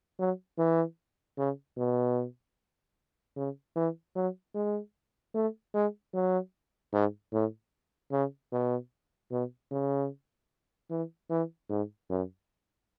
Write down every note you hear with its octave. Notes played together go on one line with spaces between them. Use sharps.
F#3
E3
C#3
B2
C#3
E3
F#3
G#3
A3
G#3
F#3
G#2
A2
C#3
B2
B2
C#3
E3
E3
G#2
F#2